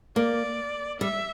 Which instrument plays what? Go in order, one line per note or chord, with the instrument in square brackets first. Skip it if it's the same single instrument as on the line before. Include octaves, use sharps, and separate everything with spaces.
[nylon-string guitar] A#3 [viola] D5
[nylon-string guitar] G3 [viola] E5